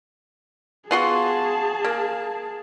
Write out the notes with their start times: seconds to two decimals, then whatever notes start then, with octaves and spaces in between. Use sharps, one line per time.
0.91 B3 F4 F#4 G#4 A5
1.84 A#3